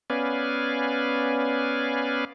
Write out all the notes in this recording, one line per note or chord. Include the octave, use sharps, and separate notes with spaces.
B3 C#4 B4 D5 F5 G#5